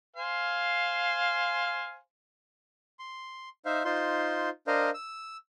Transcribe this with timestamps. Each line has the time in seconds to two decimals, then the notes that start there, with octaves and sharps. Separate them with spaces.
0.16 C5 F5 G#5
2.99 C6
3.65 D#4 C5 E5 F5
3.85 D#4 F4 C5 C6
4.67 D4 A#4 C5 D#5 F5
4.94 E6